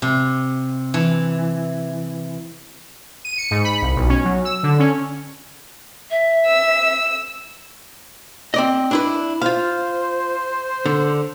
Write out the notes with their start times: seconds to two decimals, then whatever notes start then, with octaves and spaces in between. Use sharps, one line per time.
0.02 C3
0.94 E3
3.25 D#7
3.38 C#7
3.51 G#2
3.64 B5
3.82 C2
3.96 B1
4.09 C#4
4.24 F#3
4.45 E6
4.63 D3
4.79 C#4
6.10 E5
6.46 E6
8.54 C4 D5 D#5
8.91 D4 E4 B4
9.42 F4 C5 F5
10.86 D3